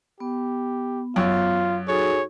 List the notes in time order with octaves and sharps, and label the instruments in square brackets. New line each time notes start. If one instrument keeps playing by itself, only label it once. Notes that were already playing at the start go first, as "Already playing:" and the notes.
[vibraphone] B3 [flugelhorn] G4
[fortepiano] F#2 [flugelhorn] F4
[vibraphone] D#4 F#4 A4 [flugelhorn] G#4 [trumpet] C#5